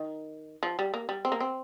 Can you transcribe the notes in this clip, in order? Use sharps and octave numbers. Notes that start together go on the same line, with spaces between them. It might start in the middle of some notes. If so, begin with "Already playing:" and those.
Already playing: D#3
F3
G3
A#3
G3
C4
A#3
C4